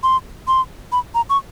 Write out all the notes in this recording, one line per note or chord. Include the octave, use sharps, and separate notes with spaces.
C6
C6
B5
A#5
C#6